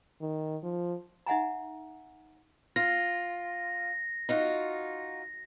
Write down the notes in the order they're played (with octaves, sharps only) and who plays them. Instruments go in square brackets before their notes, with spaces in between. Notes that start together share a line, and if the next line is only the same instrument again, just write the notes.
[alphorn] D#3
F3
[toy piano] D#4 E5 F#5 G#5 A#5
[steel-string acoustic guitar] F4 [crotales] A#6
[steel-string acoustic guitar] D#4 F4 F#4